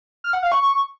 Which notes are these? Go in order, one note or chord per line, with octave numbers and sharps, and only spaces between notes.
F6
F#5
F5
C#6